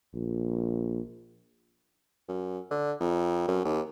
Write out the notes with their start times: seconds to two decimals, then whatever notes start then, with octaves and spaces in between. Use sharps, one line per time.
0.14 A#1
2.29 F#2
2.71 D3
3.00 F2
3.47 F#2
3.65 D#2